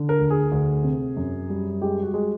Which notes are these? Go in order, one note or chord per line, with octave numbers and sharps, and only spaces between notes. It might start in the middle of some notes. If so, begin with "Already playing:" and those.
Already playing: D3
A#4
D2
G#4
D2
C3
F#2
G3
G#3 G4
F#4
G#3